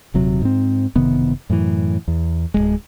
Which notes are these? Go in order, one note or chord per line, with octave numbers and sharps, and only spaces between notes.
D#1 C3 F#3
G#2 C4
F#1 C3 D#3 B3
F#2 A2 C3 E3
E2
D1 A#1 G#3